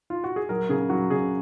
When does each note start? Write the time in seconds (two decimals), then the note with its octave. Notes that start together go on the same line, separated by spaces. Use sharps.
0.10 F4
0.24 F#4
0.36 G#4
0.49 F#3 A#4
0.69 C#3 G#4
0.89 F#3 F#4
1.10 C#3 G#4